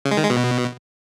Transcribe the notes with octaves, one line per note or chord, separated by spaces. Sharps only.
C#3
G#3
D#3
G#3
B2